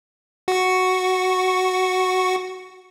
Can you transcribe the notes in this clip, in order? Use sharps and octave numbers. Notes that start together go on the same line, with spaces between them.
F#4 C#6